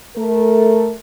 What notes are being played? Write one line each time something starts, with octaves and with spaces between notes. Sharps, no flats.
A3 A#4